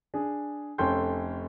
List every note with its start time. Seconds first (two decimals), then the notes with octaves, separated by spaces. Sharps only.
0.14 D4 G#4
0.78 F1 C#4 A4 G5 C6 G6